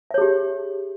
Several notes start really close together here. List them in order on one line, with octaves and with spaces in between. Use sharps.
E5 C#5 G#4 G4